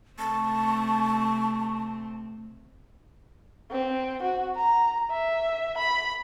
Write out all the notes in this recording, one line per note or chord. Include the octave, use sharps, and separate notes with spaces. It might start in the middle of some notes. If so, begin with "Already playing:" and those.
C3 A3 C4 A5 C#6
C4
F#4
A#5
E5
B5